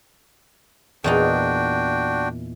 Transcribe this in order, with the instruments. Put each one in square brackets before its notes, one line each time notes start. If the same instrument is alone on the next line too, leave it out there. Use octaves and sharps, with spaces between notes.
[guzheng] E2 A#2 D#4 [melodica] D4 F#4 G5